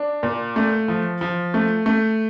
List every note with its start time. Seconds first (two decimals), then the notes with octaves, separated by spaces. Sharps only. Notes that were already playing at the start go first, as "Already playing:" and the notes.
Already playing: D4
0.23 A#2
0.56 A3
0.88 F3
1.21 F3
1.54 A3
1.86 A3